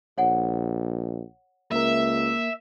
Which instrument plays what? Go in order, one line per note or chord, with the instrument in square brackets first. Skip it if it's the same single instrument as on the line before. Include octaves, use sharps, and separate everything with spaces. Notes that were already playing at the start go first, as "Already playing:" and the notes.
[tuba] A#1 [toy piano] C#5 F#5 G#5
[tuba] C#2 [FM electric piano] A#3 A#4 [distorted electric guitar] E5